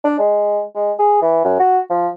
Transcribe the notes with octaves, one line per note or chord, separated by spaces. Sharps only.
D4
G#3
G#3
G#4
E3
F#2
F#4
F3